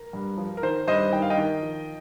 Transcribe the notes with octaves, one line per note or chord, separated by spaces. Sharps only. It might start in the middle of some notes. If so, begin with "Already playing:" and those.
Already playing: A#4
G2
F3
A#4
D#3 C5
G2 C5 D#5
D#3 G5
F5
D#5 G5
D#3
F3